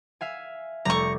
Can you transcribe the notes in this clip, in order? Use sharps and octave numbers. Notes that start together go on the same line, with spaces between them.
E5 F5 G#5
F1 G3 A3 A#5 C#6